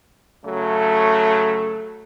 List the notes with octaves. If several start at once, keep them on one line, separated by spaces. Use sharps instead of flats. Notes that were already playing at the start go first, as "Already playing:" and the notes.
C#3 F#3 A3